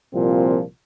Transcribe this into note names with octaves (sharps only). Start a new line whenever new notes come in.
C2 A#2 F3 C4